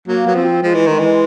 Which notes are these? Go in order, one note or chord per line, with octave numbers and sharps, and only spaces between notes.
F#3 A#3
F#3 B3
F3 C4
F3 G#3
E3
D#3 G#3
E3